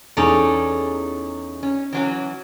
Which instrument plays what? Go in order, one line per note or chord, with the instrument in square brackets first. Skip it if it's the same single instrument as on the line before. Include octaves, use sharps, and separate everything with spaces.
[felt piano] E2 E3 D6 [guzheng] C#4 D#4 D5 [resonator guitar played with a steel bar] A4
[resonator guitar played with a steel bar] C#4
E3 F#3 C#4